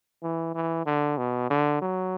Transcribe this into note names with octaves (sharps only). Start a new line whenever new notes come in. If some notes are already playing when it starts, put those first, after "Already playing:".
E3
E3
D3
B2
D3
F#3